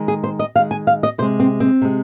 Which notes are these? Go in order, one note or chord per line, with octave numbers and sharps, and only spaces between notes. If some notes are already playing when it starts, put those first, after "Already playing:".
Already playing: D#3 G#3
G#4
C5
D#5
D#3 G#3 F5
G#5
F5
D#5
C3 G#3 C5
C4
C4
C3 G#3